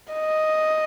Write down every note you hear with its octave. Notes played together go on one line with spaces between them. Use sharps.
D#5